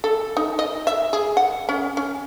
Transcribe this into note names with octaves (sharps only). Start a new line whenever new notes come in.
A4
D#4
D#5
E5
G#4
F#5
C#4
C#4